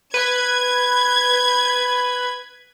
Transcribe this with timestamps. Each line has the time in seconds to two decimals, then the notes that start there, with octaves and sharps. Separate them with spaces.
0.14 B4 G#6